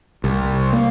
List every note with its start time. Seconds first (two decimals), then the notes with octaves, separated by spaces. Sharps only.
0.24 C2
0.73 A#3